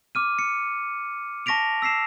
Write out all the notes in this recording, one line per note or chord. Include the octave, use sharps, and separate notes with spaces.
D6 F6 D#7
C#7
A5 C#6 A#6 B6 D7 F7
E6 B6 C7 E7